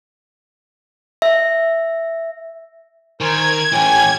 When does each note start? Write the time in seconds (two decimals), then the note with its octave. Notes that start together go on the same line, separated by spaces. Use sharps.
1.22 E5
3.21 D#3 A#4 C5 G#5 G#6
3.73 A2 E3 C#4 G4 G#5